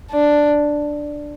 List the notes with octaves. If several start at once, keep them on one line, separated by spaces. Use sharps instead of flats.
D4